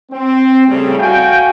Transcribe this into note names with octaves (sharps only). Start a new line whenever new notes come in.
C4
A2 C#3 G3 A3
F#4 F5 G5 G#5